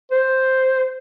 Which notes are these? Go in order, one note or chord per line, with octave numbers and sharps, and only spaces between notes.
C5